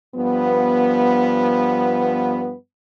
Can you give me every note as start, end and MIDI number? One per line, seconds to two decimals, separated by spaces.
0.16 2.54 43
0.16 2.54 53
0.16 2.54 59